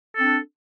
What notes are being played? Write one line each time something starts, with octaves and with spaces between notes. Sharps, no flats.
C4 D4 A4